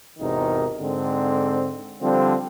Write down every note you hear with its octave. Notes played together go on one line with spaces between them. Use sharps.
G#1 E2 C3 D#3 D#4 A#4
G#2 D3 C4
D3 F3 G3 C4